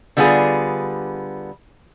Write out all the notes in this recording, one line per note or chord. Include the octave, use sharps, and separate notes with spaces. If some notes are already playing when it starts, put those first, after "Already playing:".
D3 G3 B3 F4 G#4